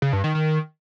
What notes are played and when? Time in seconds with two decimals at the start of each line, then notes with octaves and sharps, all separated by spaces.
0.02 C#3
0.13 G2
0.24 D#3
0.35 D#3